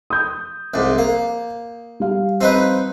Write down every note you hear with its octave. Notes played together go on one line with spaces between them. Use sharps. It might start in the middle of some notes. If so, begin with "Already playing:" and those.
D#6 G6
C2 G#2
A#3
G3 F5
C4 D#4 B4